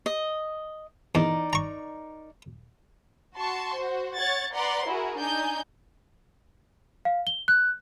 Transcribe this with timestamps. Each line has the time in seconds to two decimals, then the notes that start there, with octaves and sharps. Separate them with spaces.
0.06 D#5
1.15 E2 D#4 A#4 D5
1.53 A#5 C#6
3.34 F#4 A5 C6 C#6
3.78 F#4 C5
4.16 C#5 F#5 C#6 G#6 A6
4.54 B4 D5 F#5 A#5 C6
4.86 E4 F#4 G#4 A#4
5.18 D4 D#4 G#5 G6
7.05 F5
7.27 G7
7.48 F#6